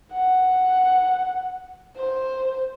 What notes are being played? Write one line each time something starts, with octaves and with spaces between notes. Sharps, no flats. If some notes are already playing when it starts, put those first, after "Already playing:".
F#5
C5